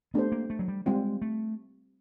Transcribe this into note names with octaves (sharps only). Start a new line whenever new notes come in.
A3 B3 D4 G4 C5
A#3
A3
F#3
G3
G3 G#3 C4 F4
A3